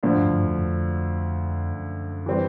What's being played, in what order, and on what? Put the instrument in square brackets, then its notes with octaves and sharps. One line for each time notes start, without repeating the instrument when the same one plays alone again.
[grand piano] D2 D3 F3 [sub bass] A2
[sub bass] G2
G2
F2
F2
F#2
[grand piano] E3 G3 C4